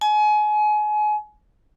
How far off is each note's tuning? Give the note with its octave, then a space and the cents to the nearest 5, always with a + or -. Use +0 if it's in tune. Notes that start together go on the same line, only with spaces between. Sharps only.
G#5 +30